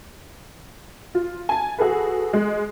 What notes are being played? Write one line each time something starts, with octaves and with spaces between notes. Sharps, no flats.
F4
G#5 A5
F#4 G#4 A4 B4
G#3